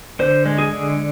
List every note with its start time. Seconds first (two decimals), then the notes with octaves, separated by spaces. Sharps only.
0.19 D3 C5
0.45 G#3
0.58 G#4
0.71 D3